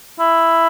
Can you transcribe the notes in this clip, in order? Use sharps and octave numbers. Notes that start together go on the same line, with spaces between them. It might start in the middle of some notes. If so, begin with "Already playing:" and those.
E4